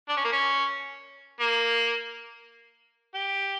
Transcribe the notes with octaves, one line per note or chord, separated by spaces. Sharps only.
D4
C#4
A#3
C#4
A#3
G4